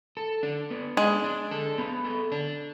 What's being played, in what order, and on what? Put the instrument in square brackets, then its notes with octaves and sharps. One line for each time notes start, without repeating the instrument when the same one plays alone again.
[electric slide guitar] A4
D4
B3
[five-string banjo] G#3 [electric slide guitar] D4
[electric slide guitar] D4
A4
B3
A4
D4